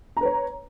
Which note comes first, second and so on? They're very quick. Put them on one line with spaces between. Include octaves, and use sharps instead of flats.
A#5 B4 C#5